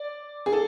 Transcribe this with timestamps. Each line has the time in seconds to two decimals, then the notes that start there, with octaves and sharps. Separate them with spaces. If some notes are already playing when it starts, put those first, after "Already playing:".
Already playing: D5
0.46 G#4
0.53 A4